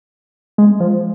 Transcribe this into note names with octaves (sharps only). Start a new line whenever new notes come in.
G#3
F3